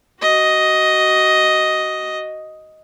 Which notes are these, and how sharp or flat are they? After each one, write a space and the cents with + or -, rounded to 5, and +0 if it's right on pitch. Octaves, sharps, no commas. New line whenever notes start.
F#4 +20 D#5 +5